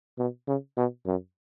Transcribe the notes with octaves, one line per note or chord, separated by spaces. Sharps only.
B2
C#3
B2
F#2